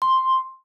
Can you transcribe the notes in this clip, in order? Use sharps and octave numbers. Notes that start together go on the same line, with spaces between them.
C6